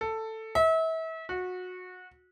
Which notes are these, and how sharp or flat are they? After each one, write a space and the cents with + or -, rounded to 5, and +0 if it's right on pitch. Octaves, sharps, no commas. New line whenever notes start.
A4 +10
E5 -35
F#4 -25